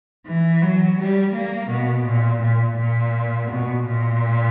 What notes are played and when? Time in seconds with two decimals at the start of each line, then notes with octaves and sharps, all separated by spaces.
0.26 E3
0.62 F#3
0.98 G3
1.34 A#3
1.70 B2
2.06 A#2
2.42 A#2
2.78 A#2
3.50 B2
3.86 A#2